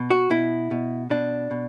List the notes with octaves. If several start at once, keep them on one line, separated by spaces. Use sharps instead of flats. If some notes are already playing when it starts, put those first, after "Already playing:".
Already playing: B2
F#4
B2 E4
B2
B2 D4
B2